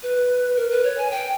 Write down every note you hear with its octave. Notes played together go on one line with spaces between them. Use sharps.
B4
A#4
B4
C#5
G#5
G5